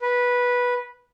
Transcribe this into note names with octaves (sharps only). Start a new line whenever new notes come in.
B4